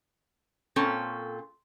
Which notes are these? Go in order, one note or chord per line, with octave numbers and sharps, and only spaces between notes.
A#2 C4 C#4 A4